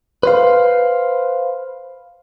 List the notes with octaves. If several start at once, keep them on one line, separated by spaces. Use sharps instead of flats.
B4 C5 F5